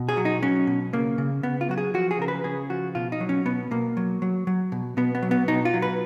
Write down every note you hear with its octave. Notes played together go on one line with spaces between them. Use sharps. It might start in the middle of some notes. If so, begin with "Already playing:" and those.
Already playing: B2
G#4
F#3
D#4
F#3 C#4
B2
C#3 A#3
C#3
C#3 B3
F4
F#3 F#4
G#4
F3 F#4
G#4
C#3 A#4
B4
C#3 G#4
F3 F#4
B2 F4
D#4
F#3
C#4
B2 B3
B2 A#3
F#3
F#3
F#3
B2
B2 B3
B3
F#3
B3
B2 D#4
F4
F#3
B4